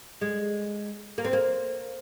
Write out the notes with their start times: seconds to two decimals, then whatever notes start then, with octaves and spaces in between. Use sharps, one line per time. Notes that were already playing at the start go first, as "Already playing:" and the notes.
0.21 G#3
1.18 A#3
1.25 C4
1.33 A#3